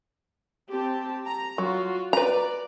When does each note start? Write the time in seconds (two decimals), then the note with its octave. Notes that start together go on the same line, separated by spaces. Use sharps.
0.71 C4 G4 A5
1.26 A#5
1.58 F#3 F4 F#4
2.13 B4 D5 A#5